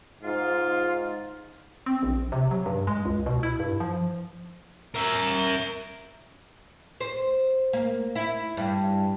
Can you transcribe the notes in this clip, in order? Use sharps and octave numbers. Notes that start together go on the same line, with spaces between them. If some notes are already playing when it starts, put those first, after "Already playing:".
G#2 F4
C4
A#1
C3
F#3
G2
G#3
C#2
B2
E4
G2
F3
A#4 E5
C5
A#3
E4
G2